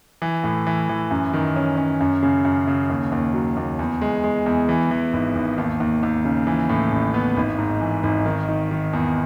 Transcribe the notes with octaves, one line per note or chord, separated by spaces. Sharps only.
E3
A2
E3
E3
F#2
D#3
C#4
C#4
F#2
C#3
F#2
C#3
D#2
D#2
F#3
D#2
E2
G#3
G#3
E2
E3
E3
G#1
G#1
D#2
D#2
D#2
C#3
E3
A2
A1
B3
G#1
G#2
E3
G#1
D#3
D#3
D#3
E2